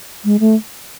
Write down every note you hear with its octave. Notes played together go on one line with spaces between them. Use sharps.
G#3
A3